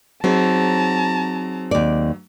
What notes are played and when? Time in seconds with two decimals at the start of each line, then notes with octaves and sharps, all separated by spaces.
0.24 F#3 C4 D#4 G#4 A5 A#5
1.71 D#2 D5